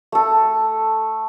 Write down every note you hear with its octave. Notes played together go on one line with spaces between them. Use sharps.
A3 A4